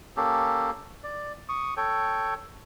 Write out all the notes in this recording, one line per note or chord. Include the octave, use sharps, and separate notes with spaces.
A#3 C#4 G4 A4
D5
C#6 D#6
A4 C#5 G5